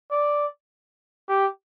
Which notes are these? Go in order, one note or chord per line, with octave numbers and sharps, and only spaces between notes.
D5
G4